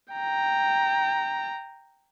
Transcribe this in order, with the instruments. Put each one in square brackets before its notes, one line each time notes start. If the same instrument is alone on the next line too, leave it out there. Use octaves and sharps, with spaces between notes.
[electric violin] G5 A#5